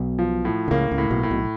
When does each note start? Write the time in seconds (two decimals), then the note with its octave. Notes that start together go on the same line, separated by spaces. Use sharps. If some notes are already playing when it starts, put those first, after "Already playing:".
Already playing: B1 B2
0.19 F3
0.45 A2
0.68 D3
0.71 C#2 C#3 A#3
0.91 C#2 C#3
0.98 A2
1.11 B1 B2
1.23 A2
1.30 B1 B2